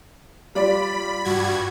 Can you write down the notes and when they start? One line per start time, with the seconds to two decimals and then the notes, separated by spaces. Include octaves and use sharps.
0.55 G3 F4 D5 B5
1.25 G2 F#4 G#6